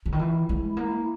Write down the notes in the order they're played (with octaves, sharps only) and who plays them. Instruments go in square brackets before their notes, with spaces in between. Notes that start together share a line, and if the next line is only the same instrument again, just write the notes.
[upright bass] C#3
D#3
[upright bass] E3 [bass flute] E4
[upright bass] G#3
A#3